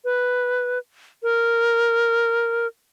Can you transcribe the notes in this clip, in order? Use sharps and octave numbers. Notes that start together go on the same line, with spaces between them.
B4
A#4